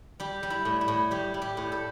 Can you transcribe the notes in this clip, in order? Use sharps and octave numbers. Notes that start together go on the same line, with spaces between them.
G3 G4
G3
E4
A2
E4
A2
G3 G4
G3
G4
A2
A4